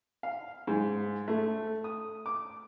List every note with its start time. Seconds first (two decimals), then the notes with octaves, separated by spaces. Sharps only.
0.23 F5
0.67 G#2
1.28 A3
1.84 D#6
2.26 D6